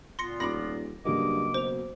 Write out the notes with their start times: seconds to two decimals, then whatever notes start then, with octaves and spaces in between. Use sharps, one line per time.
0.19 A#2 B3 F4 C6 A#6 C#7
0.40 D#1 B5 D6 A#6 F#7
1.05 G2 C#3 F#3 A#3 D#5 D6
1.54 B2 C5 F7